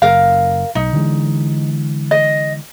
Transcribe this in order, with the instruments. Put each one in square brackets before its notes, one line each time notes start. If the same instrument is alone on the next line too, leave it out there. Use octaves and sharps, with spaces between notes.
[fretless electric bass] F#1 [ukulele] A#4 F5
[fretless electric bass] B1 [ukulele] D#4
[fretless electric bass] D3 E3 G#3
[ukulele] D#5